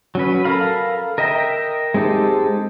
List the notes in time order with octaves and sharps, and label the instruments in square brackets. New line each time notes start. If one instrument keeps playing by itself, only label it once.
[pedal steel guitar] F#3 C#4 B4
A4 A#4 F5 B5
A#4 D#5 E5 G5
G#3 C4 D#4 G4 A4